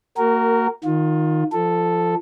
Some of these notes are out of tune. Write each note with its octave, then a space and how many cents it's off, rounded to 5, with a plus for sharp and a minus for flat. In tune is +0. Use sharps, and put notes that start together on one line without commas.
A#3 -25 F#4 +25 A#4 -10
D#3 +0 F4 +25
F3 -15 A4 +0